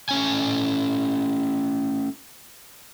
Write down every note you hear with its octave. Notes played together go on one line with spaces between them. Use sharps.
A3 C#4 G#5